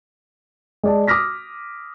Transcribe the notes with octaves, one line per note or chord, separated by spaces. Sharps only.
G#3 D5 A5
D6 D#6 F6 A#6 B6